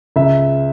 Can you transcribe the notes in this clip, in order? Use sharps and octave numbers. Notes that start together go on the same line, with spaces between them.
C#2 E5